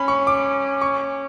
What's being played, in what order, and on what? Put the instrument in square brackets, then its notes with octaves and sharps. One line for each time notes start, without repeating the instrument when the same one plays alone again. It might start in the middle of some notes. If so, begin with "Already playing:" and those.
Already playing: [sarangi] C#4 [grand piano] B5
[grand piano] C#6
D6
C#6